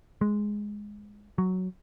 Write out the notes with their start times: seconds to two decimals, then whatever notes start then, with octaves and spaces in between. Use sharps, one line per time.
0.21 G#3
1.38 F#3